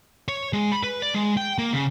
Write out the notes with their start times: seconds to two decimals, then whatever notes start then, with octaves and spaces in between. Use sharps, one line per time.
0.28 C#5
0.53 G#3
0.72 B5
0.83 B4
1.02 D5
1.14 G#3
1.37 G5
1.58 A#3
1.73 C#3